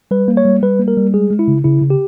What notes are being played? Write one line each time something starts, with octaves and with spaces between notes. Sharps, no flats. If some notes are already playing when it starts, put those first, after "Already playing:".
G3 B4
A#3
C#5
G3
G3 B4
A#3
A#4
G3
G#3 G#4
G#3
E4
C#3
C#3 E4
C#3
G4